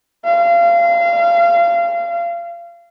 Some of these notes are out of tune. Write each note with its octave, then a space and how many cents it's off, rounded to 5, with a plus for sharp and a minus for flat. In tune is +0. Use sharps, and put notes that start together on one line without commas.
F5 -30